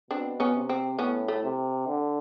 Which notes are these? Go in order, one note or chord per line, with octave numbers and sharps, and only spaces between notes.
B2 C4 D4
B3 C#4
C3
C4
A2 B3 C#4
A3
C3
D3